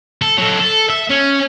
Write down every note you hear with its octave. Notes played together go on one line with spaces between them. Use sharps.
A4
F#3 A4
A4
E5
C#4